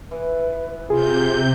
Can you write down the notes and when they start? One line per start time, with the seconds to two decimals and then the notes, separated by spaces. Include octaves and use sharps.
0.11 E3 B4
0.90 C3 F4 G#4 G6